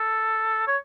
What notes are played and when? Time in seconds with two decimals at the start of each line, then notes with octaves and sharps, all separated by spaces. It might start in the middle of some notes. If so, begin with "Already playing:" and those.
Already playing: A4
0.67 C#5